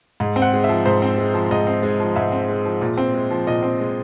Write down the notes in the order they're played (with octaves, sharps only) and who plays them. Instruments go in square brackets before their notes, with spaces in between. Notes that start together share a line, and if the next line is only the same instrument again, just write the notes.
[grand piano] G#2
C4
F#5
G#3
F3 E5
G#2 C5
C4
G#3
F3
G#2 D#5
C4
G#3
F3
G#2 E5
C4
G#3
F3
A#2
C4
G#3
F3
A#2 D#5
C4
G#3